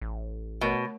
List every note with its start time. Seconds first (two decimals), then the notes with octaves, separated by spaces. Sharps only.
0.02 A1
0.61 B2 A3 A#4 C#5